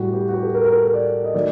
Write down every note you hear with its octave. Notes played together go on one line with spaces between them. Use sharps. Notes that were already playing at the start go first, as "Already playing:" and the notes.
Already playing: A2 G3 F#4
G4
F#4
G4
A4
A#4
A#4
A4
A#4
D5
D#5
D#3 F#3 A3 D5